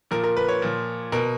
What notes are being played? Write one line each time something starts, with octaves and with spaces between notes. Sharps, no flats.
A#2 F3 A#4
A#4
B4
C#5
A#2 F3
B2 A#4